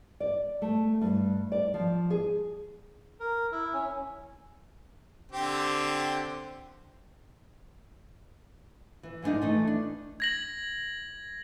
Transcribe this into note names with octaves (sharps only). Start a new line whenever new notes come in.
D5
A3
G2
D5
F3
G#4
A#4
E4
C#4
D3 C4 G4
E3
G#2 G#3 B3 D4 D#4
E3 A3 D#4
D4
G#6 A#6 F#7